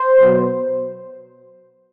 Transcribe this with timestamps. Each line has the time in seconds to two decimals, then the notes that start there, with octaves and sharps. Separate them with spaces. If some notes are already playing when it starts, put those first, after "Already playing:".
Already playing: C5
0.21 B2 F#3 B3